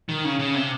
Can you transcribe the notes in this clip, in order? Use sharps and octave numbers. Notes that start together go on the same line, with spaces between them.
D#3
C#3
C#3
C3